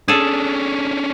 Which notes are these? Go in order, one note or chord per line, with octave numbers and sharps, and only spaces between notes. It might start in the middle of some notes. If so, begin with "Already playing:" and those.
C#4 D4 G#4 A4